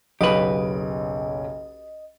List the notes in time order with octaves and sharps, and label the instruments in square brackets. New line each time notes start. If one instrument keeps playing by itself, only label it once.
[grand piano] F#1 B1 F5 [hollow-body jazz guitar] G4 B4 [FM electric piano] D#5